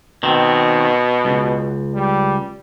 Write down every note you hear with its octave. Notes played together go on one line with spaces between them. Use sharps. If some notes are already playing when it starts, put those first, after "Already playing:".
B2 D#3 C4
C#2
G3